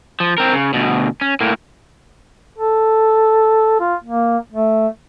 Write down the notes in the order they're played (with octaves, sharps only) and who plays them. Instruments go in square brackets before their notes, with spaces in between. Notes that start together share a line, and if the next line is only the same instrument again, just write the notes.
[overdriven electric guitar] F3
C4 A#4
C#3
D2 B2
C#4
A2 A#3
[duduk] A4
F4
A#3
A3